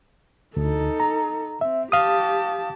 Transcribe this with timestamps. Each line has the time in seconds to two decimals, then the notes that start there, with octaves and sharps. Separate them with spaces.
0.57 D2 D#4 A4
1.00 A#5
1.61 C4 E5
1.92 G4 F5 A5 D#6